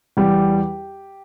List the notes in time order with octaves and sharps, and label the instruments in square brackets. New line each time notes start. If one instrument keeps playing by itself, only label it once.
[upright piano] E2 G3 G4